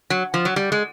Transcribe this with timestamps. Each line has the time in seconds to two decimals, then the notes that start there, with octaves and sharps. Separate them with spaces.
0.10 F#3
0.34 F3
0.45 F#3
0.56 G3
0.72 G#3